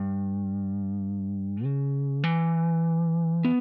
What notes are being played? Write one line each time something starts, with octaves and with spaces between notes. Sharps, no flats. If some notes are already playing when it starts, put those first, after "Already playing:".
Already playing: G2
C#3
E3
B3